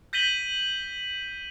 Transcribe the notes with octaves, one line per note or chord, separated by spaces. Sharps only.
G6 A#6 B6 D#7 F#7 G7